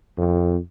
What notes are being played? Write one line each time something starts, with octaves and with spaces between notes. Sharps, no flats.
F2